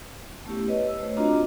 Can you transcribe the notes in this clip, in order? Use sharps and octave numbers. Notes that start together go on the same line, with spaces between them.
A3 B3 C#4 E4 G4
B4 C#5 D#5
E6
A3 C5 C#5
C4 D4 F4 F#4 D#5 A#5